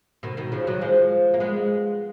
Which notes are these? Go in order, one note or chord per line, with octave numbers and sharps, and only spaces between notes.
B2 D#3
B2 D#3
C#3 F3
D#3 F#3
F3 G#3
A#3
G#3 B3